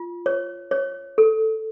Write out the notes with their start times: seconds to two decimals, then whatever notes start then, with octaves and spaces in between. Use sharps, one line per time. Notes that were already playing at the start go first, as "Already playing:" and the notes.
Already playing: F4
0.26 C#5
0.71 C#5
1.18 A4